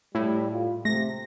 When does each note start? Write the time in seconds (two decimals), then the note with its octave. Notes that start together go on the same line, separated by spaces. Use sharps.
0.15 A2 G3
0.52 F4
0.85 C3 A3 A#6